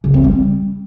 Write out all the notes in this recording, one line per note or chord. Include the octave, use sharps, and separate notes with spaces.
C#3
C4
G3